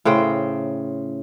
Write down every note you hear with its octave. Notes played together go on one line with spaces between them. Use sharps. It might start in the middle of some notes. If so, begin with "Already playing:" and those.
A2 C#3 C5 G5